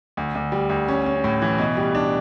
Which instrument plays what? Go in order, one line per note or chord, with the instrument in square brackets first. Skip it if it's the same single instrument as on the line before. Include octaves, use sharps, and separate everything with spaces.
[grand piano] D2
D2
G3
D2
C#4
C#4
A2
E3
B2
G3
D4